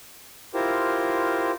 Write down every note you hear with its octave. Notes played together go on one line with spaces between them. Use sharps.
E4 F4 G4 A#4 C5